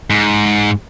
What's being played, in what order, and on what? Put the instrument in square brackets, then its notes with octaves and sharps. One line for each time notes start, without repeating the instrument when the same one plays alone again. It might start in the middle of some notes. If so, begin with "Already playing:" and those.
[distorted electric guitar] G#2